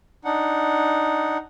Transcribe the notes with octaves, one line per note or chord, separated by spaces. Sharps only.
D4 D#4 F#5